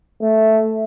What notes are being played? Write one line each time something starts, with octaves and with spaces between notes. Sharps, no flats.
A3